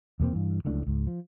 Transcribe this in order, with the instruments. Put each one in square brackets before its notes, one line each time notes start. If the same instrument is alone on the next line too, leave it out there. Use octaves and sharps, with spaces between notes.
[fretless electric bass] E2 B2 A#3 C4
G2 E3
D1 C#2 A2 D4
C#2 G#2
F3